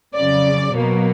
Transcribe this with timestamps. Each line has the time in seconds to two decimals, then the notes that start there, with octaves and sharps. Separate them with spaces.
0.15 F2 C#3 F#3 D5
0.72 B2 F#3 A#3